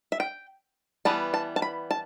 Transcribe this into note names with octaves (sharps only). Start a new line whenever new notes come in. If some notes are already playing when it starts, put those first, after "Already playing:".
E5
G5
E3 G3 B3 A5
A5
A5
B5
A5